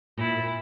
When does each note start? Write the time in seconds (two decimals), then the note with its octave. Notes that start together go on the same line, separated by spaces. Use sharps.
0.18 A#2 E4
0.36 A#2